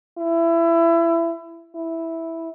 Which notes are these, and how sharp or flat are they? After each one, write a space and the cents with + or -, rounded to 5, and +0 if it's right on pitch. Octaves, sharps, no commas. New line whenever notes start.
E4 +25
E4 -5